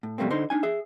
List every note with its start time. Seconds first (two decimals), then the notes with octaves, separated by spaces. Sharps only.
0.03 A2
0.18 F2 B2 G3 A3 A#3 C4
0.31 D3 D#4 C5
0.50 D4 D#4 G#5
0.63 G#4 E5